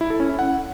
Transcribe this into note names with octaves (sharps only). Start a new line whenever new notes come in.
E4
A4
C#4
E4
F#5